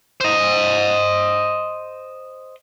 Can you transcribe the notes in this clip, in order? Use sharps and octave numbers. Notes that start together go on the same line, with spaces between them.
C5 D#5